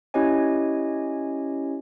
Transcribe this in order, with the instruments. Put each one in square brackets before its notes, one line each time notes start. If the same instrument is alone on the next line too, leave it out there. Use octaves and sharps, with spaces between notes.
[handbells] C#4 E4 G4 C#5 D#5 G#5